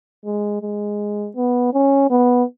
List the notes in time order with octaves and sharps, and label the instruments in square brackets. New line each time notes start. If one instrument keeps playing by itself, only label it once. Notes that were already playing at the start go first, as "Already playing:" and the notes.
[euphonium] G#3
G#3
B3
C#4
B3